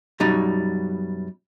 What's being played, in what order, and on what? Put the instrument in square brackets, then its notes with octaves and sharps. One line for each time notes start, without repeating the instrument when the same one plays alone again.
[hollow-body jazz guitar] F#2 B2 G3 D#4